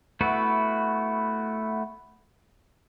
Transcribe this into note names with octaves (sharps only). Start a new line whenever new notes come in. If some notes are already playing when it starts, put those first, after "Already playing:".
A3 B3 E4 F#4